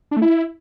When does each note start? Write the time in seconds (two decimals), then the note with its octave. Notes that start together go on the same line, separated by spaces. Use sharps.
0.11 D4
0.17 A3
0.22 E4